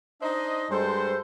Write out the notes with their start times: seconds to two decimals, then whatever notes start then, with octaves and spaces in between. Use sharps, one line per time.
0.21 D4 D#4 C5 D#5
0.71 G2 G#3 A4 C5